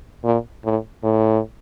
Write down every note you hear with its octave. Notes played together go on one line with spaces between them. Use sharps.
A#2
A2
A2